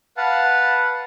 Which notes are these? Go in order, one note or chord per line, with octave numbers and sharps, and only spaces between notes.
B4 F5 F#5 A5